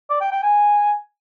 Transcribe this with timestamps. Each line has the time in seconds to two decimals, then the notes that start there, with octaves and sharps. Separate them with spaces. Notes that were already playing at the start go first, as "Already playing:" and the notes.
0.10 D5
0.21 G5
0.32 G5
0.43 G#5